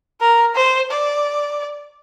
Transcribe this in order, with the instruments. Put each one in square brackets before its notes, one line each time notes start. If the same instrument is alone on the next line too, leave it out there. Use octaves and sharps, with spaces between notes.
[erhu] A#4
C5
D5